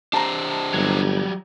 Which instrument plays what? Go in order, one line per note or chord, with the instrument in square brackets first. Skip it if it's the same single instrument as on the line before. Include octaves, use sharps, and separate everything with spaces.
[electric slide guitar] D4 G4 C5 [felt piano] A5 A#5
[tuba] G1 [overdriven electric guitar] F#3 G3